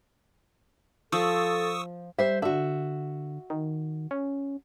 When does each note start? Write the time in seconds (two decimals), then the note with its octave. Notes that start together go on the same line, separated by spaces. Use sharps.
1.12 F3 A4 C#6 D#6 E6
2.19 G3 C5 E5
2.42 D3 F#4 E5
3.50 D#3
4.11 C#4